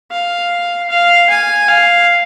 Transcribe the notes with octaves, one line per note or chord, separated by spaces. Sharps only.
F5
F5
G#5
F5